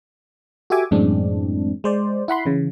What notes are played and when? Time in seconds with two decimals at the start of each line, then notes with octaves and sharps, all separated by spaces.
0.70 F#4 G4 A4 E5 G#5 D6
0.91 F#2 A2 E3 G#3 C4 D4
1.84 G#3 C5 D5
2.28 E4 F#5 B5 C6
2.45 C#3 E3